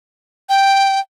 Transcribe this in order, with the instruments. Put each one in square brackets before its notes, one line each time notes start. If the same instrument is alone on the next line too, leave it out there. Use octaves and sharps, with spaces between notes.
[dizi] G5